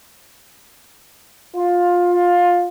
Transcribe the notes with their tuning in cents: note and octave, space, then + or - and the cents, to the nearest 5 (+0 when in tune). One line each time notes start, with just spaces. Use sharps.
F4 +15